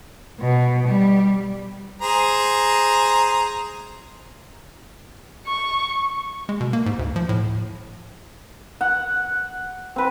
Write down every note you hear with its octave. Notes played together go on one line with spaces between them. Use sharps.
B2
G3
G#4 C5 A#5
C#6
G#3
B2
A#3
G#2
D2
F3
A2
F#5
C4 B4